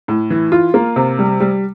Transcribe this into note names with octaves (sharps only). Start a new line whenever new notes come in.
A2
E3
F4
A#3
C3
G3
G3